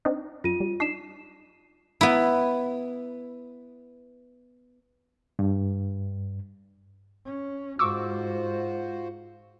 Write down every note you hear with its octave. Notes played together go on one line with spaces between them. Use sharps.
C4 D4 D#4
F#2 F4 D#7
G3
D4 D#4 B6 C7 E7
B3 E4
G2
C#4
G#2 F4 F#4 C5 C#6 D6 E6